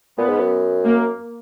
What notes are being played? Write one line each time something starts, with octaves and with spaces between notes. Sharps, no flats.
A#2 B3
G#2
F#2
A#3